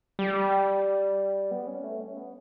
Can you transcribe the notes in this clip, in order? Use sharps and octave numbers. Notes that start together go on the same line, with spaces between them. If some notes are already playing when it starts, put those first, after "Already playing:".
G3
B3
C#4
A3
C#4
B3